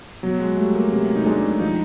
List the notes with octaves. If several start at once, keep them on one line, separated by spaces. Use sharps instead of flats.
B2 F#3
G#3
G3 A3
A#3
C3
D#4
G#3 D4
F3 D#4